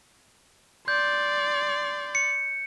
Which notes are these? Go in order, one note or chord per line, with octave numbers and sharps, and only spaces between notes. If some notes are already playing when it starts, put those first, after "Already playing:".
D5 C6 G6
C#7